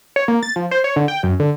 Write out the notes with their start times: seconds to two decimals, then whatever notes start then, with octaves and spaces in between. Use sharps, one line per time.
0.16 C#5
0.28 A#3
0.43 A6
0.56 F3
0.71 C5
0.84 C#5
0.96 D3
1.08 G5
1.23 F#2
1.40 D3